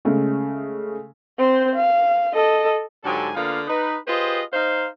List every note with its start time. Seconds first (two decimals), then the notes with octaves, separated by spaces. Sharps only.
0.05 C#3 G#3 A3
1.38 C4 C5
1.75 F5
2.35 A4 D#5
3.04 G#2 D3 F#3 G4 A4 G#5
3.36 D3 A#3 B3 F4 F5
3.68 D#4 B4
4.08 F4 G4 G#4 B4 C5 D#5
4.53 D#4 C5 F5